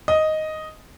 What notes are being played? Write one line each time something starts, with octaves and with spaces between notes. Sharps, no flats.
D#5